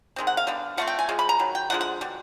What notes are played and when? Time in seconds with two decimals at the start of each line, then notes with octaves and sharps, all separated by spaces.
0.16 D#3 G#3 C4
0.27 F#5
0.37 F5
0.47 D3 G3 B3
0.77 F3 A3 C4 F#5
0.87 G5
0.99 G#5
1.09 F3 G#3
1.19 B5
1.29 A#5
1.39 D#3 F#3
1.55 G5
1.70 D3 F3 G#3 F#5
1.81 F#5
2.01 B2 G3